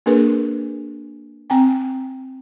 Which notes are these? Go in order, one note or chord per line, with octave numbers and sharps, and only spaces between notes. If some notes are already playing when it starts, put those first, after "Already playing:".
A#3 D4 G#4 A#4 B4
C4 G5 G#5